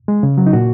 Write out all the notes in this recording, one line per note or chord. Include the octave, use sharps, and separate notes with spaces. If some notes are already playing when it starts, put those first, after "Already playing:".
G#3
C#3
F#3
D#4
A#2 F#4